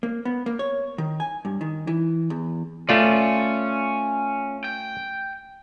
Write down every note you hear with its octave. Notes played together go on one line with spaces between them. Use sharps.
A#3
B3
A#3
C#5
D#3
G#5
G2
D#3
E3
E2
A3 C#4 F4 D5
G5